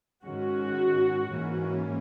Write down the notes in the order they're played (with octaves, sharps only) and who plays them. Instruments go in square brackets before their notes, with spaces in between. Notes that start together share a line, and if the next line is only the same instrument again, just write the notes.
[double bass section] G#2 D#3 G#3 C#4 [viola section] F#4
[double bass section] G#2 E3 A#3 C#4